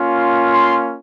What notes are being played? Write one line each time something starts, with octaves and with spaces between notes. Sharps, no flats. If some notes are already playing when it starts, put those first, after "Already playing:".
Already playing: A#3 C#4 F4
C6
C6